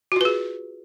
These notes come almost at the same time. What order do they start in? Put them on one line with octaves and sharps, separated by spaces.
F#4 F4 B4 G#4